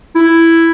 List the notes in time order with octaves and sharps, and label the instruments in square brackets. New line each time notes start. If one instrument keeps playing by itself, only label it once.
[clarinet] E4